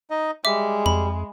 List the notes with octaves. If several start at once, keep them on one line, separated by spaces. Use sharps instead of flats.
D#4 D#5
G3 G#3 E5 D6
F2 B5